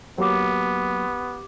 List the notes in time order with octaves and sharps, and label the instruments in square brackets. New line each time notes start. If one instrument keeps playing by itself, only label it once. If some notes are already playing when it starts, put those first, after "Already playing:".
[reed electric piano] F#3 A#3 [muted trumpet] B3 [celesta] G4 D6